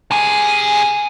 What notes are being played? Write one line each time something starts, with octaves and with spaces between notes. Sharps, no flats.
C3 G#4